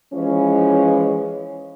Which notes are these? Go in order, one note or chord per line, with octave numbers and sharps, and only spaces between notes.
E3 F3 G#3 C#4